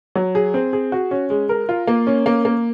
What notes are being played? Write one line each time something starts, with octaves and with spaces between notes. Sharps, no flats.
F#3
G#4
C4
G#4
F#4
C#4
G#3
A#4
F4
A#3
C#4
A#3
A#3